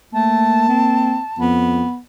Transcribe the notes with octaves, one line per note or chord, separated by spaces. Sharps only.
A3 A#3 A5
C4
F2 B3